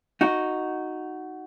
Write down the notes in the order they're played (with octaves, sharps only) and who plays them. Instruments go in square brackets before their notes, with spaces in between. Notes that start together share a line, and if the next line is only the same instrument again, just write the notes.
[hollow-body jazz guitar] D#4 F#4